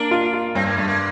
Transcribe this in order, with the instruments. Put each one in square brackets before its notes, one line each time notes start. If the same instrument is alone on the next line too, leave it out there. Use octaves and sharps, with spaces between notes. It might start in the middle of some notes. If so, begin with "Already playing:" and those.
Already playing: [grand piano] A#3 [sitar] D4
[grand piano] F4
F4
[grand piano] G2 [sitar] C4
[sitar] A#3
[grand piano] G2 [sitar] A3
[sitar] A#3